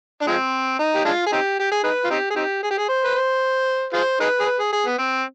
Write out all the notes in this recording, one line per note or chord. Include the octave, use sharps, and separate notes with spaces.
D4
F3 G#3 C4
D#4
G4
G#3 D4 F4
G#4
C4 D#4 G4
G4
G#4
D#4 G#4 B4
F4
C4 D#4 G4
G#4
C4 D#4 G4
G#4
G4
G#4
C5
B4
C5
F4 G#4 C5
D#4 G#4 B4
G#4
B4
G#4
G#4
B3
C4